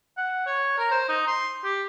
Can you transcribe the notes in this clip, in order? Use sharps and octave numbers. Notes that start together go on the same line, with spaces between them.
F#5
C#5
A#4
C5
D#4
C6
G4